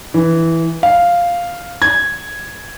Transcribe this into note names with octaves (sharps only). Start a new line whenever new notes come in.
E3
F5
G#6